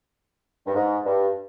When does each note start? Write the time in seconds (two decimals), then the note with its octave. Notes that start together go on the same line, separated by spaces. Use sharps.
0.66 G2
0.75 G#2
1.06 G2